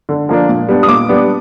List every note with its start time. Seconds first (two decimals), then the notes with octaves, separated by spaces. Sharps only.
0.09 D3
0.29 F3 A#3 D4
0.49 A#2
0.68 G3 B3 D4
0.83 D#6
0.89 A#2 D6
1.08 G3 B3 D4